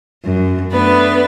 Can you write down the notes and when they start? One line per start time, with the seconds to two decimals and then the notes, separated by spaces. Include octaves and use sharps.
0.24 F#2
0.71 A3 B3 D4 B4